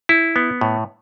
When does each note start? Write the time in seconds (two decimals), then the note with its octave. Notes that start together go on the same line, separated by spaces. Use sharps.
0.09 E4
0.36 B3
0.61 A2